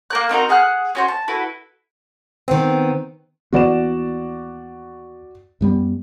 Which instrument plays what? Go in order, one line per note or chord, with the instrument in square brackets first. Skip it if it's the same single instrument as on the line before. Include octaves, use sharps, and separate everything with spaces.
[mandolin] A#3 A#4 F#6
C4 D#4 F#4 A#4
G#4 F#5 F6 F#6
C#4 F#4 C5
A5
E4 F#4 A4 B4
[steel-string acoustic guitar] D#3 B3 [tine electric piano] C4
[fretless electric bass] D#2 E3 B3 [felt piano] F#4 D5 E7
[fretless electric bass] F#2 G3 B3